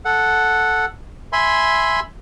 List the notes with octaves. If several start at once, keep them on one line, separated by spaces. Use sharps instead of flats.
A4 F#5
E5 G#5 B5 C6